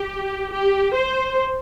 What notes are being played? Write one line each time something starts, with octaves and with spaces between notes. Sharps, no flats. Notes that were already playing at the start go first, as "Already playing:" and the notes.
Already playing: G4
G4
C5